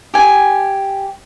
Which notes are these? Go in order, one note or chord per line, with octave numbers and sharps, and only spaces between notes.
G4 G#5